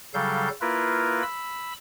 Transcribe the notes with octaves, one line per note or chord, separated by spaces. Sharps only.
C#3 F#3 G3 A4 F5 G6
A#3 E4 F4 A#4 B4
B5 E6